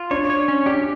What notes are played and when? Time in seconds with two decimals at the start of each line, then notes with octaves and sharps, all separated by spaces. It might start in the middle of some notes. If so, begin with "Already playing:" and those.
Already playing: F4
0.11 D4 C#5
0.30 C#5
0.48 C#4
0.66 D4 G4